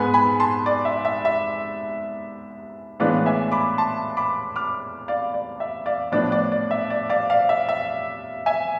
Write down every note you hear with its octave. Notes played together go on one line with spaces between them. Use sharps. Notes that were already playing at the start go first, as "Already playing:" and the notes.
Already playing: G#2 G#3 B3 G#5 B5
G#5 B5
A5 C6
D5
E5
E5
E5
A2 E3 G#3 B3 D4 D5 F5
E5 G#5
B5 D6
A5 C6
B5 D6
D6 F6
D5 F5
D5
E5
D5 F5
A2 F3 B3 D4 D5
D5
D5
E5
D5
D5 F5
D5 F5
E5
E5
E5 G#5